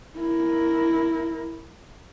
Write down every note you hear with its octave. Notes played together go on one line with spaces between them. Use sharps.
E4 A#4